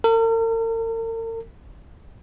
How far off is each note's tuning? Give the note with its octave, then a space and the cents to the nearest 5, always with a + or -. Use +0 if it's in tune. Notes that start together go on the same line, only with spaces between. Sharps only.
A#4 -45